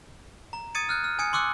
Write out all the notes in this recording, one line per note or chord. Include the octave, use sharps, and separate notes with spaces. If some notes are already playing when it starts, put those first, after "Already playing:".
A#5
D#6 G#6 A6 C#7 D#7
F6 F#6 G#6
F6
G#5 D#6 G#6 C#7
C6 D6 E6 F#6 C#7